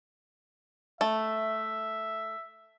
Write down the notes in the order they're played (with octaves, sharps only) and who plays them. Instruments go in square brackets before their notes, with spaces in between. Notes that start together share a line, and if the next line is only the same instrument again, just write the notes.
[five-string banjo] A3 [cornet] E5